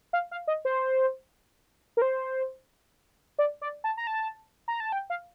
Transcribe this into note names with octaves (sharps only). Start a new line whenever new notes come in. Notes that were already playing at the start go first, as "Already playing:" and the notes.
F5
F5
D#5
C5
A#4
C5
D5
D5
A5
A#5
A5
A#5
A5
G5
F5